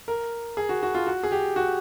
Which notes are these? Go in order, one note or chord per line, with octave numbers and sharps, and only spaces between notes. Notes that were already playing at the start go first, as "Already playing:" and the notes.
A#4
G#4
F#4
F#4
F4
F#4
G#4
G4
F#4